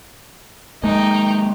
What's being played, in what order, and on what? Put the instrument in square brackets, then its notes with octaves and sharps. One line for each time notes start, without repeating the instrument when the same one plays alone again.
[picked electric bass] G#3 A#3 [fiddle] D#4 G5